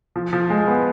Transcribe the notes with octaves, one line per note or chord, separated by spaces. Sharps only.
F3
F3
G#3
B3